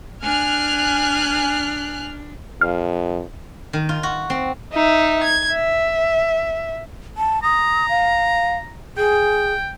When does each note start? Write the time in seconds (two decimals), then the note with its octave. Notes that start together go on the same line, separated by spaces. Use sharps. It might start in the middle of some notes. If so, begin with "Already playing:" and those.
0.23 D4 G#5 F6 F#6
2.61 F2 F5
3.73 D#3
3.89 F4
4.03 F#4
4.30 C4
4.73 D#4 E5
5.23 G#6
5.52 E5
7.17 A5
7.43 A#5 D#6
7.89 F5
8.97 G#4 G5